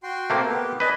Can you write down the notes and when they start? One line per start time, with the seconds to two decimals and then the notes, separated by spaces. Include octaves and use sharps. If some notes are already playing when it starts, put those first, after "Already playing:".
0.03 F#4 G5 C6
0.30 A3 A#3 C4
0.46 B3 G4
0.80 D4 B4 D#5 G#5